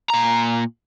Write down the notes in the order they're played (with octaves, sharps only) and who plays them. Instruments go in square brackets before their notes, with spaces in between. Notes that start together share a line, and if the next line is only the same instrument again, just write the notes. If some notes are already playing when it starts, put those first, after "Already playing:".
[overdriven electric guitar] A#2 A#5